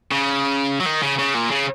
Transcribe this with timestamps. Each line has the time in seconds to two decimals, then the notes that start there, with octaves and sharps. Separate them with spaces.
0.12 C#3
0.80 F#3
0.86 D#3
1.02 C#3
1.18 C#3
1.34 A#2
1.51 C#3